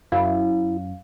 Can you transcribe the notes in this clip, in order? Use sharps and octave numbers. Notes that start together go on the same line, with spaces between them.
F#2 C#4 E4 F5